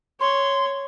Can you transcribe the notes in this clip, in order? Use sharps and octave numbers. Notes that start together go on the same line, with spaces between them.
C#5 C6